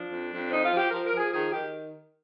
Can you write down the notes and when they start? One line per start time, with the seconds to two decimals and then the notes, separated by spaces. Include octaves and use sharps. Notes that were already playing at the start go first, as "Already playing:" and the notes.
Already playing: F3 D4
0.09 F2
0.31 F2
0.50 F3 D#4
0.64 F4
0.70 F3
0.77 G4
0.90 F3 A#4
1.05 A#4
1.12 F3
1.17 G#4
1.32 D#3 G#4
1.52 D#3 G4